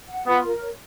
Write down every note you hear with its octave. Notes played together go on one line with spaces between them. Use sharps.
F#5
B3 F4
A#4
C#5